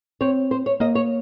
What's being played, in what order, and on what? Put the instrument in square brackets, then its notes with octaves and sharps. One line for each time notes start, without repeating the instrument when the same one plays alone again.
[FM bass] C4 [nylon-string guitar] C#5
[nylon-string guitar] C5
C#5
[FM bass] A#3 [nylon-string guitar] D#5
[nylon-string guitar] C#5